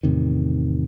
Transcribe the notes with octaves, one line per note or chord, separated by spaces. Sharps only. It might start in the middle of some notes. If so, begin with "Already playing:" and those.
E2 A2 C3 D#3